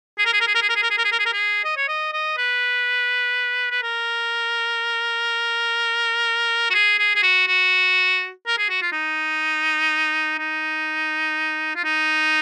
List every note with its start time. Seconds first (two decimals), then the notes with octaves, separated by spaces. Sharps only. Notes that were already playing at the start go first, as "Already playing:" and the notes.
0.19 G#4
0.26 A#4
0.33 G#4
0.41 A#4
0.47 G#4
0.55 A#4
0.62 G#4
0.69 A#4
0.76 G#4
0.83 A#4
0.91 G#4
0.98 A#4
1.05 G#4
1.12 A#4
1.19 G#4
1.26 A#4
1.33 G#4
1.65 D#5
1.77 C#5
1.89 D#5
2.13 D#5
2.38 B4
3.71 B4
3.83 A#4
6.70 F#4
6.74 G#4
6.99 G#4
7.16 G#4
7.23 F#4
7.48 F#4
8.47 A#4
8.58 G#4
8.70 F#4
8.82 F4
8.92 D#4
10.39 D#4
11.76 F4
11.84 D#4